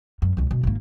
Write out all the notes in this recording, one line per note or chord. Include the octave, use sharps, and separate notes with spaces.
F#2
C#2 C3
B2
G#1 A#3